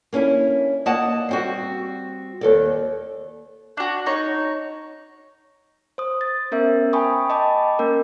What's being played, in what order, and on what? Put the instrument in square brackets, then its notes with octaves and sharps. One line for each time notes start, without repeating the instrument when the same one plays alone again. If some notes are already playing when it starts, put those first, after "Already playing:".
[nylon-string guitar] A#3 C#4 D4 E4
A#3 D5 D#5 F#5 A5
G3 C4 F#4
D#2 A4 D5
[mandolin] D4 F#4
D#4 C#5
[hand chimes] C5 D#6
A6
B3 C#4 A#4 C5 E5
G5 G#5 B5 C#6 D#6
D#5 G5 A5 B5 D6
A#3 C#4 A#4